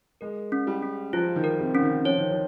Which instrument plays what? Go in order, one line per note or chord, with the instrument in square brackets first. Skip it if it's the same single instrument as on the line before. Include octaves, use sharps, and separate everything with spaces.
[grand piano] G#3 [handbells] A#4
[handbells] C#4
[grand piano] G3
[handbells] C#4
[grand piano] F3 [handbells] F4
[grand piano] D#3
[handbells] A#4
[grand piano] C3
[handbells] C#4
[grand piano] D#3
[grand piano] F3 [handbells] C#5
[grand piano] D#3
F3